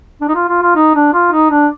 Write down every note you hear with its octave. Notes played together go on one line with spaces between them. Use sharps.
D4
D#4
F4
F4
F4
D#4
D4
F4
D#4
D4